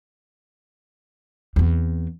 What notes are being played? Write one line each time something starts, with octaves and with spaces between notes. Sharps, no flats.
E2 C4